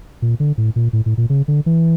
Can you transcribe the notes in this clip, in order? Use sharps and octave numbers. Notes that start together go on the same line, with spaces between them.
A#2
D3
A2
A#2
A2
A2
A#2
C#3
D3
E3